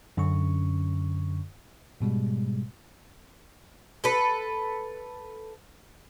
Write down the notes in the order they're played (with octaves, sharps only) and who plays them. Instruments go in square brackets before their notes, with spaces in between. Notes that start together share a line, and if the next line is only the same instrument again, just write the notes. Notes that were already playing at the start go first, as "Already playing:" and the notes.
[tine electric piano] F#2 D3 C#4 C#6
G#2 B2 G3 G#3
[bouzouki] A4 B4